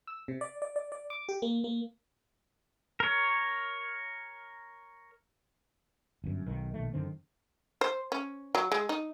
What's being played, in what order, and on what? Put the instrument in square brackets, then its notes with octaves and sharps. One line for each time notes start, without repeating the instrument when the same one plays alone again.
[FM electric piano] E6
C3
D5
D5
D5
D5
D6
G4
A#3
A#3
[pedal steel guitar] A#4 C#5
[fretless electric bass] G1 F#2
B1 D#3
A#1 B2 D#3 A3
F#2 D3 D#3 C4
[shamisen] C5
C#4
F#3
G#3
D#4